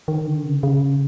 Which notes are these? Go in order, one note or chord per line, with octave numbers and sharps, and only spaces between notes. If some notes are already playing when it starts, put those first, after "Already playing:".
D#3
D3
C#3
C#3